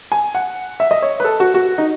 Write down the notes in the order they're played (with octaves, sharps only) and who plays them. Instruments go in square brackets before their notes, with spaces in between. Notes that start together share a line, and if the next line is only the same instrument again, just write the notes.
[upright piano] G#5
F#5
E5
D#5
C#5
B4
A4
F#4
F#4
D#4